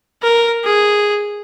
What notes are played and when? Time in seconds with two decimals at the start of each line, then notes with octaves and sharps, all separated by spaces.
0.23 A#4
0.64 G#4